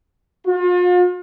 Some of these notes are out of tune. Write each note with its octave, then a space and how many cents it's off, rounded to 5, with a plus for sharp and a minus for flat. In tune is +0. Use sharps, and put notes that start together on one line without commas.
F4 +40